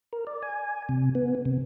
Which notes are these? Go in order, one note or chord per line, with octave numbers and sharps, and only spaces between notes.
A#4
D5
G#5
C3
B3
C3